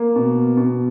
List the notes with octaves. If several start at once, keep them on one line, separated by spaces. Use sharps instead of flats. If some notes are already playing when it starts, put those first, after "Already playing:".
Already playing: A#3
B2
B2